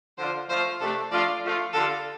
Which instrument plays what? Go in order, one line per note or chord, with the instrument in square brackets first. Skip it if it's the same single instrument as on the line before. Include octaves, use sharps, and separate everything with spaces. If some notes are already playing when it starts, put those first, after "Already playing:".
[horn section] D3 F3 D4 F4 [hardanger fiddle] C5
[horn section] F3 A3 F4 [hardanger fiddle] C5
[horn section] C3 A3 D4 [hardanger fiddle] A4
[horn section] F3 A3 D4 F4 [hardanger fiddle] D5
[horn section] F3 A3 F4
[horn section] D3 G3 F4 [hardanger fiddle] A4